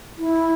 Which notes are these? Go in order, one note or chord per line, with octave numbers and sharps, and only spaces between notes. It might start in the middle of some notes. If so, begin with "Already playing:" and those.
E4